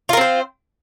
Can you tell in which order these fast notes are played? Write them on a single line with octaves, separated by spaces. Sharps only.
F4 A#4 C4 C5